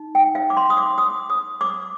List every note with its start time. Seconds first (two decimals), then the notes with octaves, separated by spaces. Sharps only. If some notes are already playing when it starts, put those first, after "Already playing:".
Already playing: D#4
0.15 G5
0.35 F5
0.50 D6
0.57 C6
0.70 D#6
0.77 D6
0.98 D#6
1.30 D#6
1.61 D6